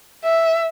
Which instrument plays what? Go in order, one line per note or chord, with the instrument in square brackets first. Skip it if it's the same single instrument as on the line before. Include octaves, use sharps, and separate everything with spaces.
[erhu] E5